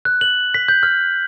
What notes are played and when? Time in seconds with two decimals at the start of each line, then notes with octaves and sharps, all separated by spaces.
0.05 F#6
0.21 F#7
0.54 B6
0.68 G6
0.83 F6